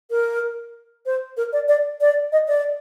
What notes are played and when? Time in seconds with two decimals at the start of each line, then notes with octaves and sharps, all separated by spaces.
0.11 A#4
1.06 C5
1.37 A#4
1.53 D5
1.68 D5
2.01 D5
2.32 D#5
2.48 D5